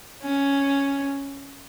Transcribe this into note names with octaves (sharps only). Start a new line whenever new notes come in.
C#4